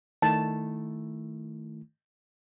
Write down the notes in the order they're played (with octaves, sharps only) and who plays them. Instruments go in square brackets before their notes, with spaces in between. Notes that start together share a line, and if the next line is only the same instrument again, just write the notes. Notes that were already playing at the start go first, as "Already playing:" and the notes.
[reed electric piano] D#3 A3 E4 [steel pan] A5